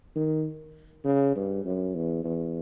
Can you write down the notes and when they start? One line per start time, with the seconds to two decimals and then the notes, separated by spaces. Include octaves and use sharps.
0.16 D#3
1.04 C#3
1.35 G2
1.65 F#2
1.94 E2
2.24 E2